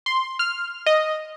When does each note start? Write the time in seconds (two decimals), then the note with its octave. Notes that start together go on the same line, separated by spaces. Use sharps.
0.06 C6
0.39 F6
0.86 D#5